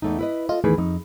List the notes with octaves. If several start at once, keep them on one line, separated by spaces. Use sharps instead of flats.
E2 A3 D#4
E4 B4 D#5
F4 A4 D#5
E2 A2 D#3 G#4 B4
F2 D#4